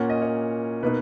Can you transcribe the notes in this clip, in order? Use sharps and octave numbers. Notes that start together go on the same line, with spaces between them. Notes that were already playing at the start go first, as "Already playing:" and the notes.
Already playing: A#2 A#3 C#4 F#5
D#5
C#5
B2 A#3 D#4 B4